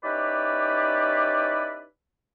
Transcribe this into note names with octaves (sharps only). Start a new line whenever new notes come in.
C#4 D#4 E4 G4 B4 D5